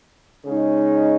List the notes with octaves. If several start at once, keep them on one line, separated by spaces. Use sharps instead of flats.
C#3 G#3 D#4